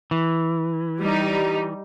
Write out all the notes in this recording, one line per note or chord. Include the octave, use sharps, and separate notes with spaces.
E3
G3 D#4